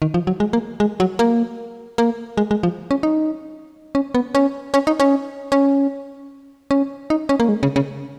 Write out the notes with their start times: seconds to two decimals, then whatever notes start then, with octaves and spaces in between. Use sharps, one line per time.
0.02 D#3
0.14 F3
0.27 F#3
0.40 G#3
0.53 A#3
0.80 G#3
1.00 F#3
1.19 A#3
1.98 A#3
2.37 G#3
2.51 G#3
2.63 F3
2.91 C#4
3.03 D#4
3.95 C#4
4.14 B3
4.35 C#4
4.74 C#4
4.87 D#4
5.00 C#4
5.52 C#4
6.71 C#4
7.10 D#4
7.29 C#4
7.40 A#3
7.49 G#3
7.63 C#3
7.76 C#3